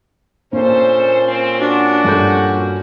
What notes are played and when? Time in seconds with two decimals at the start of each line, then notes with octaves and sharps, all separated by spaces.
0.53 A#2 A#3 C#4 D4 A4 C5
1.28 C4
1.60 D4 F#4
2.04 G2 A4 G6